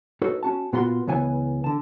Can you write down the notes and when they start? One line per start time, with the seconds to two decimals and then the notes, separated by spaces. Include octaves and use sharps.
0.22 D#4 F#4 A4 B4 C#5
0.43 C#4 F#4 A5
0.73 A#2 B3 F4 F#4 B5 C6
1.07 C#2 C#3 E3 B3 G#5
1.64 D3 A5